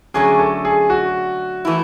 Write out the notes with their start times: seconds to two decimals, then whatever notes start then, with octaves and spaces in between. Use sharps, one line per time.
0.14 D3 F#3 A3 C#4 G#4
0.39 A4
0.65 G#4
0.90 F#4
1.65 E3 A3 E4